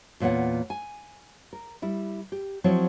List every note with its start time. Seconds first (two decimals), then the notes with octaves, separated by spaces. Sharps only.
0.20 E2 A#2 B3 C#5 F#5
0.70 G#5
1.53 A#4
1.82 G3 E4
2.32 G4
2.64 F3 F#3 C4 E4 C#5